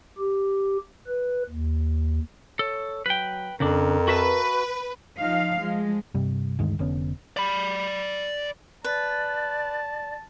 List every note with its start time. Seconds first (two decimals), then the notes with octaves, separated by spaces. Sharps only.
0.18 G4
1.07 B4
1.50 D#2
2.59 A4 C#5
3.06 F#3 B4 G5
3.60 F2 C#3 D4 A#4
4.08 F#4 B4 E5 A5
5.18 F3 D#4 F5
5.58 F3 G#3
6.15 G2 C3 G3
6.59 D2 G2 D#3 G#3
6.79 F1 D3 B3 C#4
7.37 D5 B5
8.84 B4 D5 A5